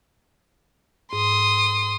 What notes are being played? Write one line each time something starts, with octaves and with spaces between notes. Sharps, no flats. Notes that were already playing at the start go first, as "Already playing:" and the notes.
G#2 C6 D#6